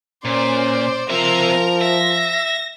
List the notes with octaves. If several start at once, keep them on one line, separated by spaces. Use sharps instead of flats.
A#2 C#4 C5 D5
F3 C4 A#4 E5 A#5
E5 A#6